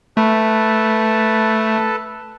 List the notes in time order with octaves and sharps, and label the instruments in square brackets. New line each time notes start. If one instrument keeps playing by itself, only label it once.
[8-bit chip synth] A3 [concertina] A4 B4 A5